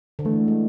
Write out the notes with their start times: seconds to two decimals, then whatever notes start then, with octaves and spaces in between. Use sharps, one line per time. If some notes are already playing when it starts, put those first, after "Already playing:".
0.19 D3
0.25 E3 A3
0.48 G#3